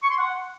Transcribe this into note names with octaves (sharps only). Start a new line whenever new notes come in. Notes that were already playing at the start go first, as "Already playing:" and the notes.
C#6
C6
F#5